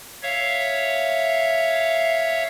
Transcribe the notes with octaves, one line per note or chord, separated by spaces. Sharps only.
C#5 E5 F5